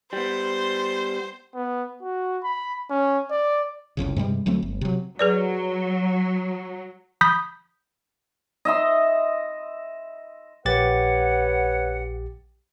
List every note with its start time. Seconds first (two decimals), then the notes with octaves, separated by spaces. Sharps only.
0.13 G3 B3 C5
1.55 B3
2.03 F#4
2.44 B5
2.90 C#4
3.31 D5
3.97 F1 C2 F2 C#3
4.17 G2 C3 G3 G#3
4.46 D2 F#3 A3 C4
4.63 G1
4.81 C3 F#3
5.19 F#3 G#4 B4 D5
7.21 B5 D#6 G6 B6
8.65 D#5 E5 C6
10.65 A#1 G4 B4 C#5 F#5 A6